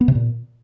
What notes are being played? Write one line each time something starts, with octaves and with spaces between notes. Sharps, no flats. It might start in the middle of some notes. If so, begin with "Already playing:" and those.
B3
C3
A#2